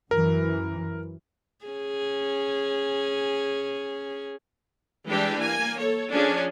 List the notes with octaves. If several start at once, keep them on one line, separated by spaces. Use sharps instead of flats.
F#2 E3 A#4
C#4 G#4
E3 G3 G#3 D4 G4 G5
A#3 G#5
A4 C#5
F3 C#4 D4 G#4